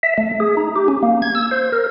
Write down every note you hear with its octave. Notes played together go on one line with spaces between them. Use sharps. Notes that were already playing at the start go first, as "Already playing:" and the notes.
E5
A3
G#4
D#4
G4
C#4
A#3
G#6
E6
C5
A#4